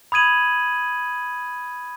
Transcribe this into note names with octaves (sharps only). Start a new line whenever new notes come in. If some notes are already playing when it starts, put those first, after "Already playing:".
B5 D#6 G#6 D#7 F#7